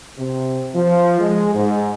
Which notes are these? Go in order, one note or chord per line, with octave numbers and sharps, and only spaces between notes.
C3
F3
G#3
G#2